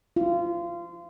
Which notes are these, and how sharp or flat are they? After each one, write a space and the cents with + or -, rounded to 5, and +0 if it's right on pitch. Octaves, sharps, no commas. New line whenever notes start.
F4 -25